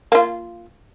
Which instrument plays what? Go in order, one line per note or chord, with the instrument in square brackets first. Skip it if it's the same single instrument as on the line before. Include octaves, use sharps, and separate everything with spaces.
[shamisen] A#3 F4